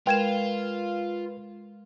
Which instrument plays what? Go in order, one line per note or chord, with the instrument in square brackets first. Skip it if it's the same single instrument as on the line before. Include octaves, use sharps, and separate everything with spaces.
[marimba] G#3 A#4 [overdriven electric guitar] F4 [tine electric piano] B4 [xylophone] G5 G#6 E7